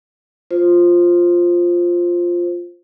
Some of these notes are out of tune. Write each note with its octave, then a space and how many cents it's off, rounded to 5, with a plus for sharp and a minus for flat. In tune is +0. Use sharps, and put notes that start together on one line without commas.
F4 +0 C5 +5